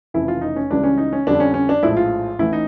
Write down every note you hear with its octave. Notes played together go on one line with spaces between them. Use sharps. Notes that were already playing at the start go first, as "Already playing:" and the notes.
F1 F2 C#3 E3 E4
F4
D#4
C#4
C#2 C#3 E3 G3 D4
C#4
D#4
C#4
F2 D3 G3 D4
C#4
C#4
D4
A#1 A2 F3 G#3 E4
F4
A1 A2 E3 E4
D#4